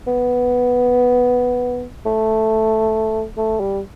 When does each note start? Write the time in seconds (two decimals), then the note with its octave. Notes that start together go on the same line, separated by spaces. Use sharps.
0.07 B3
2.06 A3
3.37 A3
3.60 G3